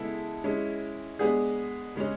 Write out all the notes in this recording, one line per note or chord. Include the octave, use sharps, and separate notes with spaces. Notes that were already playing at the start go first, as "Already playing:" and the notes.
Already playing: C#3 G#3 B3 E4 A4
G#3 C#4 E4
G#3 B3 D4 G#4
C#3 G#3 C#4